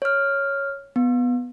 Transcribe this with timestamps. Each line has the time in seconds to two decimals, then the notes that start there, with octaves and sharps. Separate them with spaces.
0.02 C#5 F6
0.96 B3